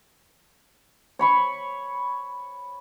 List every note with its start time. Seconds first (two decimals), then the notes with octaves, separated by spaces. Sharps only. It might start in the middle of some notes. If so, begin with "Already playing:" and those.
1.19 C#5 B5 C#6